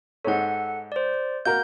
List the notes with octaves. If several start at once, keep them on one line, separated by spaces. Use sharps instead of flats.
G#2 A4 C#5 F#5
C5 D5
A#3 F#4 A#4 G6